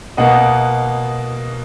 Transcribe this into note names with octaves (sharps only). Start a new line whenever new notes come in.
B2 A#3 D#5 F#5